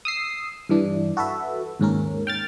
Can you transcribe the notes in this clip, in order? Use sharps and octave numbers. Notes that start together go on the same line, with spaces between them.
D#6 E6 C7
G2 E3 D4
F#4 A4 B4 E5
D#2 G#2 C#4 A#4
G5 F6 A6